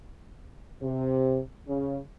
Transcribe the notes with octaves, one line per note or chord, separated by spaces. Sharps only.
C3
C#3